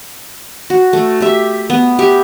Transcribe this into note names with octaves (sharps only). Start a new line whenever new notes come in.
F#4
A3
G4 E5
B3
G4 E5